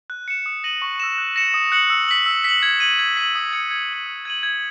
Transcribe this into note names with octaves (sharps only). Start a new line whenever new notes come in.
F#6
C#7 E7
D#6
A#6 D#7 F#7
C#6
E6 A#6 E7
F#6
A#6 C#7 E7
D#6
F#6 C#7 F#7
E6
B6 F#7
E6
B6 F#7
G#6
D#7 F#7
G#6
B6 D#7 F#7
D#6
G#6 C#7
G#6
C#7 F#7
E6
G#6 D#7 F#7
G#6